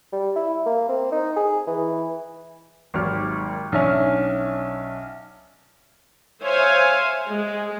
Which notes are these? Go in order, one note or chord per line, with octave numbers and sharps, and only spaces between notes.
G3
E4
A#3
C4
D#4
G#4
E3
G#1 D#2 F#3 D6 F6
B1 C#4 D4 E5 G#5 F6
C5 C#5 E5 F5 G#5
G#3